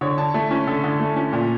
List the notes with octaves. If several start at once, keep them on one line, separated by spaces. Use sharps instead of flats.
D3 C#5
D3 A5
A3 A5
C#4 C#5
D3 A4
D3
A3
C#4
A#2